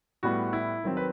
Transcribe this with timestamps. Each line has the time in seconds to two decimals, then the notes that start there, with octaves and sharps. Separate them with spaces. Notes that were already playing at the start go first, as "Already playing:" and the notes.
0.23 A2 G3 B3 F#4
0.53 E4
0.84 D#3 F#3 C4
0.97 B4